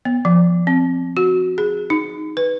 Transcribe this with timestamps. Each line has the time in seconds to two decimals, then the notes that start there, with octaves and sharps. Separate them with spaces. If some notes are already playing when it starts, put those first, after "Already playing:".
0.05 B3
0.25 F3
0.67 C4
1.17 F#4
1.58 G#4
1.90 D#4
2.37 B4